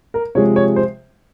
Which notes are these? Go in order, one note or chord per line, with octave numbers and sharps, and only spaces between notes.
A#4
C3 F3 G#3 C#5
C#5
C5